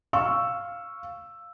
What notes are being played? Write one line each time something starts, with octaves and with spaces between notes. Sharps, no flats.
F5 C#6 E6